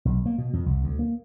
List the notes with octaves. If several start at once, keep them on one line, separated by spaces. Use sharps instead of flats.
B1
A#3
B2
F2
C2
D2
A#3